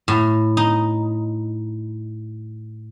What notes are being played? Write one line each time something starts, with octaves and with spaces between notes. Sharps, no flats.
A2
D#4